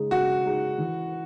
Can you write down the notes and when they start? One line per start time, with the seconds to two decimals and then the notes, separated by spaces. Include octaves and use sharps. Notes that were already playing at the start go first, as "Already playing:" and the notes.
Already playing: C#3 G#3 D#4 G#4
0.11 C#3 F#4
0.45 G#3 D#4 G#4
0.78 E3